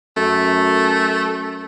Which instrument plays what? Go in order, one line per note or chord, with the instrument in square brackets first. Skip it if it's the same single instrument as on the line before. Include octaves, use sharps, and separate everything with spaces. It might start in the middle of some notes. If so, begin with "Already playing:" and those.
[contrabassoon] F#2 [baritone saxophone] A3